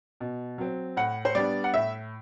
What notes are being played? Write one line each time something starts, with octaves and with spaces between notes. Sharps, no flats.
B2
F#3 C4
A2 F#5
C5
G3 B3 D4 D5
F#5
A2 E5